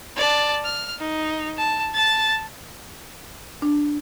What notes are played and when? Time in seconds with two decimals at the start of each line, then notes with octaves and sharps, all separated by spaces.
0.17 D5 A5
0.64 F6
1.00 D#4
1.57 A5
1.95 A5 A6
3.62 D4